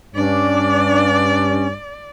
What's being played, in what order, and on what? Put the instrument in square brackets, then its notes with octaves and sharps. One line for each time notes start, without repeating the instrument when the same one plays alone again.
[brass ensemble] G2 [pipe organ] C#4 [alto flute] D4 [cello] D5